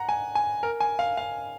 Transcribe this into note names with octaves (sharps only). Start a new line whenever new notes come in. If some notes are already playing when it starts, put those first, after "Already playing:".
Already playing: F#5 A#5
G#5
G#5
A#4
G#5
F5
F5